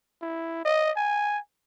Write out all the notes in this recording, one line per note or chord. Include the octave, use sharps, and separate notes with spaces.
E4
D#5
G#5